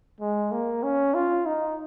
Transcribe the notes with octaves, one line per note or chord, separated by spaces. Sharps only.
G#3
A#3
C#4
F4
D#4